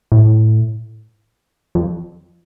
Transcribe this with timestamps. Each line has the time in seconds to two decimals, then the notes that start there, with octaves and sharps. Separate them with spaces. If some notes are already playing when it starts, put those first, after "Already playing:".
0.12 A2
1.75 F2